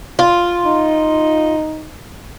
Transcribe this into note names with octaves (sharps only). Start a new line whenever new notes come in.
F4
D#4